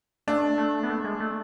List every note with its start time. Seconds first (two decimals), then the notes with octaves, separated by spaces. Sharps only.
0.27 A3 D4
0.58 A3
0.83 B3
0.90 A3
1.04 G#3
1.20 A3